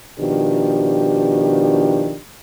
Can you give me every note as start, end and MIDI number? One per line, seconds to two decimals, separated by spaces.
0.19 2.18 47
0.19 2.18 51
0.19 2.18 53
0.19 2.18 62
0.19 2.18 67